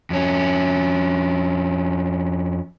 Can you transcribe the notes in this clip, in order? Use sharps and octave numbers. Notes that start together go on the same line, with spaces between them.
F2 C#4